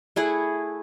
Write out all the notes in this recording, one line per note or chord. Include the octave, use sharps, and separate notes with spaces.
A3 E4 G#4 F#5